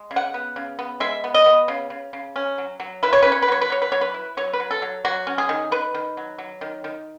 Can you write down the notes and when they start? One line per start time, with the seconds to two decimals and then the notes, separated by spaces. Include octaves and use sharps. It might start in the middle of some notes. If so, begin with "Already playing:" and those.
Already playing: G#3
0.11 C#3
0.16 F#5
0.34 B3
0.56 C#3
0.79 B3
1.00 G#3 E5
1.24 B3
1.34 D#5
1.46 B3
1.68 C#3
1.90 C#3
2.13 C#3
2.36 C#4
2.58 F#3
2.80 F#3
3.03 E4 B4
3.13 C#5
3.22 C#4 B4
3.32 C#5
3.42 B4
3.48 F#3 C#5
3.61 B4
3.70 F#3 C#5
3.82 B4
3.92 F#3 C#5
4.01 B4
4.14 E4
4.37 F#3 C#5
4.53 B4
4.60 F#3
4.71 A4
4.82 F#3
5.05 F#3 F#4
5.27 C#4
5.38 G#4
5.49 D#3
5.72 D#3 B4
5.94 D#3
6.17 F#3
6.38 F#3
6.61 D#3
6.84 D#3